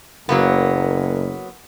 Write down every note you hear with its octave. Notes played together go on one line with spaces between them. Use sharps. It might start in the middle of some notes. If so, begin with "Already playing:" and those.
F#1 F#3 A#3 B3